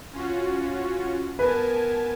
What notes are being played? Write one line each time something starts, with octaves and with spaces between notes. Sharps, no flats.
C#4 F4 F#4
B3 A#4 B4 G#5 A5